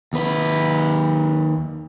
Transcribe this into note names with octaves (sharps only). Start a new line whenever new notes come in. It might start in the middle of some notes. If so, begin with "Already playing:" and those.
D#2 B4